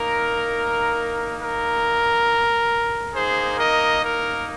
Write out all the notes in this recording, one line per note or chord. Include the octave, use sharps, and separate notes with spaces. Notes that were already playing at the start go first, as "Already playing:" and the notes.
Already playing: A#3 D#4 A#4
A#4
A#3 D#4 G#4 C5
A#4 D#5
A#4